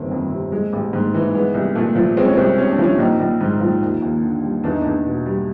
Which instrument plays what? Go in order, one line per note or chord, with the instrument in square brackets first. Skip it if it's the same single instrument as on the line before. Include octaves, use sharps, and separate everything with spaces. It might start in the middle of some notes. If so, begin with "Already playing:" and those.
Already playing: [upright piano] G1 D#3 C4
F2
C3
G#3
A1
G#2
E3
G#3 B3
C2
A#2 A3
F3
G#3 C4
C#4
C2 C4
C3 C#4
D4
F3
C#4
A#1 D#4
A#1
G#2
F3
D#2
D#2
D3
G3
E2 D4
D#4
E2 D4
B2
G3